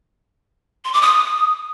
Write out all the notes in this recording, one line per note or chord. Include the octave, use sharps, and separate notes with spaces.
C6
D6
D#6